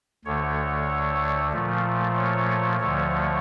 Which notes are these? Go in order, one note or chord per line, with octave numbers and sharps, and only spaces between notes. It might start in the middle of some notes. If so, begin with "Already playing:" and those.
D2 D3 A3 C#5
A#2 F3 A3
C#5
D2 D3 F3 A3 C#5